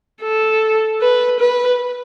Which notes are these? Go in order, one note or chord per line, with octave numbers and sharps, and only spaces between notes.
A4
B4
B4